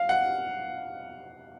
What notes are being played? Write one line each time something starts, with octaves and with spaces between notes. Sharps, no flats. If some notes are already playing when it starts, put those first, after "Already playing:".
Already playing: F5
F#5